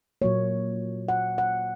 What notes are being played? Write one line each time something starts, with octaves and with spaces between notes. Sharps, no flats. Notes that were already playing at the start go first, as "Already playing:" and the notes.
A#2 F#3 A#3 C#5
F#5
F#5